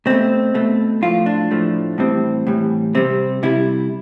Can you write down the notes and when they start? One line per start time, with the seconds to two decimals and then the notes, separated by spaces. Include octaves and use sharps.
0.06 B2 A3 C4
0.54 B2 A3
1.02 A2 F3 A3 F4
1.26 D4
1.51 A2 F3 A3
1.98 A2 E3 G3 C4
2.47 A2 E3 G3
2.95 C3 G3 C4
3.43 C3 G3 E4